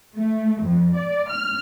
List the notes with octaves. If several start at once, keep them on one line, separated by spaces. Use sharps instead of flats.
A3
F2
D5
F6